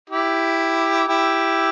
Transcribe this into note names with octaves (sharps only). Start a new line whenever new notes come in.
E4 G4
E4 G4